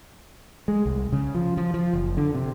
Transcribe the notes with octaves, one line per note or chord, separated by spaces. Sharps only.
G#3
C2
C#3
F3
F3
F3
F#1
D3
C3